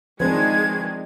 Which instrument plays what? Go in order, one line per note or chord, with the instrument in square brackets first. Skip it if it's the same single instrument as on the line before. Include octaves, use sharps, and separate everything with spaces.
[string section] D#3 G#3 [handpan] F3 C4 D4 [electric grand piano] B4 C5 [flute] G#6